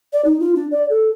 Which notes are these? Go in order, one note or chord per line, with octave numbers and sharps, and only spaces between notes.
D5
D#4
F4
D4
D5
A4